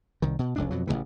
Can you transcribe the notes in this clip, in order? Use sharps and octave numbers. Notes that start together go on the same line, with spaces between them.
C2 D#3
B2
F1 C#2 D4
F2 B2 F#3
A1 A2 C#3 E3